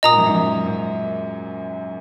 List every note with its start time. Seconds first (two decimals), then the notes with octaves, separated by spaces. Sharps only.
0.03 A#2 D#5 A#5 D#6
0.11 G#2
0.18 F#2
0.26 G#2
0.34 F#2
0.66 G#2